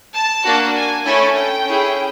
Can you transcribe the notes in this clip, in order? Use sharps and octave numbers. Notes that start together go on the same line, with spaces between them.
A5
A#3 D4 F#4
G#5
A3 C#4 E4 A4 G#5
G5
C#4 E4 G#4